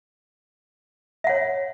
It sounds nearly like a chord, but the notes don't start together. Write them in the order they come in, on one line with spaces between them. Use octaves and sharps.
E5 F#5 C#5